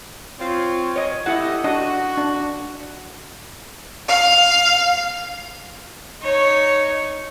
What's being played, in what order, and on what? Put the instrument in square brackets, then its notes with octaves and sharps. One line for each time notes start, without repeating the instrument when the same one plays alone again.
[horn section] C4 F4 C#5
[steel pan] C#5 D#5
[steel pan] E4 F#5 [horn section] G4 A4 D#5
[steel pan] D4 D#5 [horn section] F#4
[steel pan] D4
[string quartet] F5
[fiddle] D#4 C#5